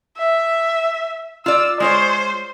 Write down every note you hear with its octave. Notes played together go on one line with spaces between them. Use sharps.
E5
F4 D5 E6
G#3 F4 C5 C#5